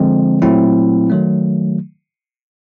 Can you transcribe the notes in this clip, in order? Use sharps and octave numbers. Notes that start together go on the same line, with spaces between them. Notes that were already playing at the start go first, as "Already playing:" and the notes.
Already playing: D3 F3 G#3 C4
A#2 F#3 A3 C4 E4
D#3 F#3 A3